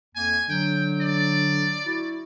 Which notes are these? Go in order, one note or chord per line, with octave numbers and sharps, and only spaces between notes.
F2 A#3 G#5
D3 F#3 G5
D5
E4 F#4